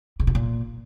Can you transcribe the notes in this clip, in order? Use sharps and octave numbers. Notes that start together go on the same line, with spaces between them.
C#3
B2
A#2